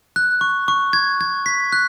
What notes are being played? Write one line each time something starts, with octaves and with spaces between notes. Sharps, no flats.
F#6
C#6
C#6
G#6
G#6
B6
F#6